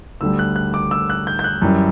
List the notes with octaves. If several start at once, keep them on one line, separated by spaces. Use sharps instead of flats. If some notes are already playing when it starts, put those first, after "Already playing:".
D2 D3 G3 E6
F#6
F#6
D6
E6
F#6
G6
G6
F#6
F#2 E3 G3